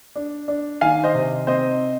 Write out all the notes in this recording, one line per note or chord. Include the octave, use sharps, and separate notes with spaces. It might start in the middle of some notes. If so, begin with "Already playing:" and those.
D4
D4
D#3 F5 G#5
C5 D#5
C3
C4 C5 D#5